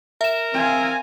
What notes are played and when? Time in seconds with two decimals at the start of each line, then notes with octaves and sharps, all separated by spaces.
0.21 A#4 E5 E7
0.53 C4 F5 G#5